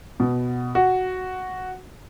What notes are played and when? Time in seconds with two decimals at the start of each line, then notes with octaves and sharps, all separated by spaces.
0.20 B2
0.75 F#4